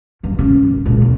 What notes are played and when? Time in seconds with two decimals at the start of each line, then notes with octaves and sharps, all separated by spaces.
0.23 E2 G2
0.39 C#3
0.65 G#1
0.85 C#2 A#2
1.02 E1